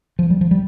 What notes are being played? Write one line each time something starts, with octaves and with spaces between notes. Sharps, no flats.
F3
G3
F3
G3